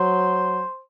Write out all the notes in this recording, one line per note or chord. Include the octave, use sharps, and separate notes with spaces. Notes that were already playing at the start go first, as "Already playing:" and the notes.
Already playing: F#3 C5